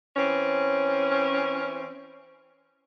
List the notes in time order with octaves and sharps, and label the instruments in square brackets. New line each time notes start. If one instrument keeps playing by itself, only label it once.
[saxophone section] E3 C4 C#4